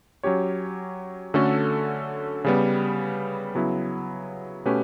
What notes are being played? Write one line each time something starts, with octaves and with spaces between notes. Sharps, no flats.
F#3 C#4 G4 C#5
D3 A3 C#4 F#4 A4
C#3 G3 B3
C#3 F#3 B3 E4
B2 A3 C#4 G4 B4